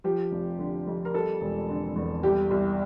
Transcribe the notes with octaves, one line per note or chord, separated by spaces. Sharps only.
F3 G4
F1
D3
F2
A#4
G3 A4
E1
D3
E2
C2 G4
C2